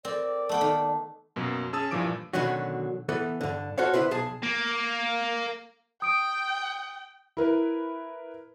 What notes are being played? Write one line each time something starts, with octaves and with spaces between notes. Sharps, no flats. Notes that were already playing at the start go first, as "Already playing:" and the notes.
C4 A4 A#4 D5
A3 B3 G5 A5
D#3
F#2 B2 A#3
C#4 G#4 A5 D#6 E6 A6
G2 A#2 E3 F3 D6 D7
B2 D3 D#3 F#3 C#4 F#4
E3 B3 A4
G2 D3
F#4 A4 C5 C#5 F5
D3 D#3 E4 B4 C5
B1 G#4 A5
A#3
G5 D#6 D7
E4 A#4 B4